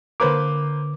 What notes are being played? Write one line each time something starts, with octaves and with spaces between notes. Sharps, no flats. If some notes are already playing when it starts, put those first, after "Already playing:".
D3 A#3 B4 C5 D6